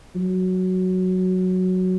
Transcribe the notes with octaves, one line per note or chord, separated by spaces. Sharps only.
F#3